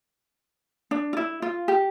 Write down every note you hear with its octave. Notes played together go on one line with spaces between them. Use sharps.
D4
F4
E4
F4
G4